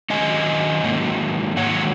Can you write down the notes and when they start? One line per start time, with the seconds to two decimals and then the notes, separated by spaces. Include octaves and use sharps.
0.10 D#3 F#3 C#4 D#5 G#5
0.84 G#2 D#3 F#3 A#3
1.56 G#2 D#3 F#3 A#3 C#5 F#5